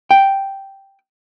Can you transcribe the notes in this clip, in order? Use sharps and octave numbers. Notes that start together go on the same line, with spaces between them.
G5